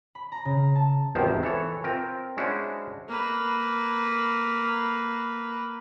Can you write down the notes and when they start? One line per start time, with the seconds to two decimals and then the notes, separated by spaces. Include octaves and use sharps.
0.15 B5
0.32 A#5
0.45 C#3
0.75 A5
1.15 G#1 E2 C3 D#3 F3 C5
1.43 E3 A4 C#5
1.84 C4 F4 A#4
2.37 G#3 C#4 D4 E4 F#4 C5
3.08 A#3 B4